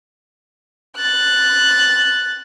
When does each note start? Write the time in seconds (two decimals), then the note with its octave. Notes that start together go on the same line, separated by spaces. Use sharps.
0.97 F#6 A6